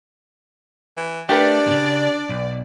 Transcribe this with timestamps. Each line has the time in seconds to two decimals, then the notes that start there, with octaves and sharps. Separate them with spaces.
0.97 E3
1.29 A3 D4 G4 A#4 B4 D5
1.67 A#2 C#3
2.29 B1